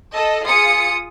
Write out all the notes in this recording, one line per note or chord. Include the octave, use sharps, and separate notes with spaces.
A4 D#5
F4 G#4 D#6 C#7